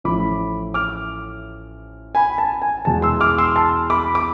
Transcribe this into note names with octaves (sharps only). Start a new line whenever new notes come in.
A1 A2 F3 B5 D6
D6 F6
G#5 B5
A5
G#5
E2 B2 G#3 A5
C6 E6
D6 F6
C6 E6
A5 C6
B5 D6
D6